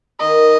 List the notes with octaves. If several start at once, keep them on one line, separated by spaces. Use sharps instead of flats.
D#3 D#5